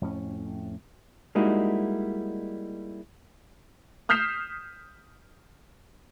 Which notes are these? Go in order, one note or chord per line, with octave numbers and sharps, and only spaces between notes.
F2 A2 C#4
G3 G#3 A#3 D#4 E4 F#4
D#6 F6 G6 B6 C7 E7